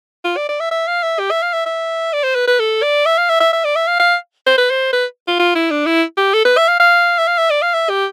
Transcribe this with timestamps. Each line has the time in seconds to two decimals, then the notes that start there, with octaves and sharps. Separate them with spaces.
0.24 F4
0.37 D5
0.49 D5
0.60 E5
0.71 E5
0.87 F5
1.03 E5
1.19 G4
1.31 E5
1.42 F5
1.53 E5
1.66 E5
2.12 D5
2.24 C5
2.35 B4
2.47 B4
2.59 A4
2.82 D5
3.05 E5
3.18 F5
3.29 E5
3.40 E5
3.53 E5
3.64 D5
3.76 E5
3.88 F5
3.99 F5
4.46 C5
4.58 B4
4.70 C5
4.93 B4
5.28 F4
5.39 F4
5.55 E4
5.71 D4
5.86 E4
6.17 G4
6.34 A4
6.45 B4
6.57 E5
6.68 F5
6.80 F5
7.18 E5
7.28 F5
7.38 E5
7.50 D5
7.62 F5
7.74 E5
7.89 G4